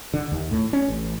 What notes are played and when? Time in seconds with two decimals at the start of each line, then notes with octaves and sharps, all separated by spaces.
0.14 D3
0.32 D#2
0.51 A2
0.73 C#4
0.88 A1